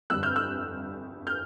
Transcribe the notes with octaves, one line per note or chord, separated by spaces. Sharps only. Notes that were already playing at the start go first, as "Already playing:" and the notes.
G1 F2 D3 G3 E6 F#6
F6 G6
E6 F#6
F6 G6